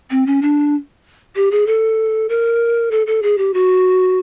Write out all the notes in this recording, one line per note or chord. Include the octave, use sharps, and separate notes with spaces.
C4
C#4
D4
G4
G#4
A4
A#4
A4
A4
G#4
G4
F#4